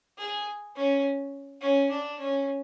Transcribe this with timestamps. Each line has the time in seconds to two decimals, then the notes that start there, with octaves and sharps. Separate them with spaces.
0.18 G#4
0.76 C#4
1.61 C#4
1.90 D4
2.19 C#4